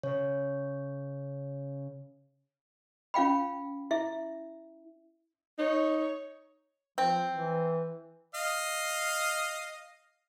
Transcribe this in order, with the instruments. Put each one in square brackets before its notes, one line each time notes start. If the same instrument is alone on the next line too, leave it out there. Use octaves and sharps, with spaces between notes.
[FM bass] C#3 [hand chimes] C#5
[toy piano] C#4 F4 F5 G5 B5
E4 E5
[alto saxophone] D#4 [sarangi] C#5
[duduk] F3 [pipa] C4
[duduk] E3
[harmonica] D#5 F5